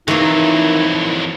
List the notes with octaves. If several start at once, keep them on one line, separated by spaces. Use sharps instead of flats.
F2 D#3 E3 F#3 A#3 E4